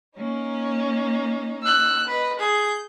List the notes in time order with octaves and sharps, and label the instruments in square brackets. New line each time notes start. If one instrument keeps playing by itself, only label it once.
[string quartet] A#3 C#4 D#4
[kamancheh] E6 F#6
[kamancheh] B4 [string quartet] D#5
[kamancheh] G#4 [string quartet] G6